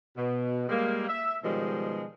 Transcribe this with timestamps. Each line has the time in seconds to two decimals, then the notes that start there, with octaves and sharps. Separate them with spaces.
0.17 B2
0.69 G3 G#3 A#3
1.08 E5
1.44 B2 D#3 F3 G3 G#3